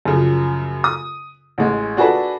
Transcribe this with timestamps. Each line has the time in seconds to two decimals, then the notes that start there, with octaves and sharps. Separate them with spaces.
0.05 F#2 C#3 F3
0.84 D#6
1.58 A1 G#3
1.97 D4 F#4 G#4 A4 B4 A5